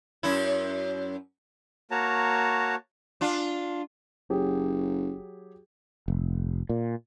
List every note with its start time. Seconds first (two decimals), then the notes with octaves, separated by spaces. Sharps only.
0.23 F#2 E4
1.91 A#3 F#4 C#5 A5 A#5
3.21 D4 F4
4.30 F#1 F#3 G4 G#4
6.08 F1
6.69 A#2